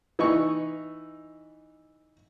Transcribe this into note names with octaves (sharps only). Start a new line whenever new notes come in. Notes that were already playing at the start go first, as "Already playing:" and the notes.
E3 D#4 C#6